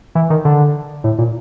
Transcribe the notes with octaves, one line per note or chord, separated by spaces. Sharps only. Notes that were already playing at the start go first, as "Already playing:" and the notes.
E3
D#3
D3
A2
A#2